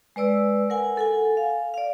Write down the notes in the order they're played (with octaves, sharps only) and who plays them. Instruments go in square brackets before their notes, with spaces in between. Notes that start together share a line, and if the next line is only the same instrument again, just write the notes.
[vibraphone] G#3 B4 D5 E6
A#4 F#5 G#5
A4 F#5 G#5
F5
D5 F5